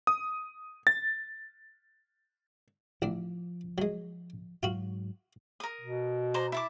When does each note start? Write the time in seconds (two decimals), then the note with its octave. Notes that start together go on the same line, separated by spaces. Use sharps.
0.07 D#6
0.87 A6
3.02 A1 F3 D4
3.78 F#3 G#3
4.63 G#2 F#3 F4 F#4
5.60 A#4 D#6
5.81 B2
6.34 C5 D5 A#5
6.52 E4 A5 D6